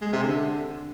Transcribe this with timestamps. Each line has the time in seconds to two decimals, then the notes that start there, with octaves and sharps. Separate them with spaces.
0.01 G#3
0.13 C3
0.24 D3